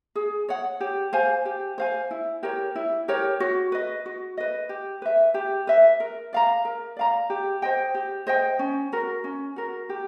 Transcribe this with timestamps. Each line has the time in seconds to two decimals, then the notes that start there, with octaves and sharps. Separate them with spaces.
0.15 G#4
0.49 C#5 F#5
0.80 G4
1.13 C5 F5 G#5
1.45 G4
1.78 C5 F5 G#5
2.11 E4
2.43 G4 A#4 C#5
2.75 E4
3.08 G4 A#4 C#5
3.40 F#4
3.72 B4 D#5
4.06 F#4
4.37 B4 D#5
4.69 G4
5.02 B4 E5
5.34 G4
5.67 B4 E5
6.00 A#4
6.33 D5 F5 A#5
6.65 A#4
6.97 D5 F5 A#5
7.30 G4
7.62 C5 D#5 G5
7.95 G4
8.27 C5 D#5 G5
8.59 C#4
8.92 F#4 A#4
9.24 C#4
9.56 F#4 A#4
9.89 G4